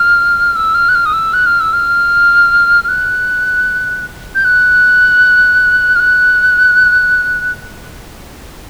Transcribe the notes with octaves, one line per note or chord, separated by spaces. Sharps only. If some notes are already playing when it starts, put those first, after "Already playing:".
Already playing: F6
E6
F6
F#6
F6
D#6
E6
F#6
F6
E6
F6
F6
F#6
G6
F#6
F6
F#6